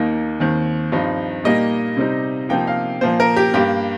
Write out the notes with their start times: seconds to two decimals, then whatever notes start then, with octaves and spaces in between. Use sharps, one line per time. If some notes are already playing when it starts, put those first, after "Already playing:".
Already playing: D#2 D#3 A#3 D#4
0.40 D#2 D#3 C4
0.92 G2 F3 C4 D#4
1.44 A#2 G3 A#3 D#4 D#5
1.97 C3 G3 C4 D#4
2.49 C3 F3 A#3 D#4 G5
2.67 F5
3.01 A#2 F3 A#3 C5
3.20 A#4
3.36 G4
3.54 G2 G3 A#3 G4